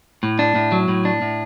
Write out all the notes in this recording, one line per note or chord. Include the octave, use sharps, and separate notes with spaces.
A2
D4
A2
F#3
A2
D4
A2